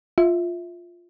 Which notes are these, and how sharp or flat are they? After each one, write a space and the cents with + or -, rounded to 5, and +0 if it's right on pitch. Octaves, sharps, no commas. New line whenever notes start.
F4 +0 E5 -10